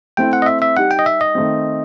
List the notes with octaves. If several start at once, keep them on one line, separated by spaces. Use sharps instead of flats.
A3 C4 E4 G5
F#5
D#5
E5
E5
G3 D#4 G4 F#5
G5
D#5
E5
D#5
D#3 A3 C4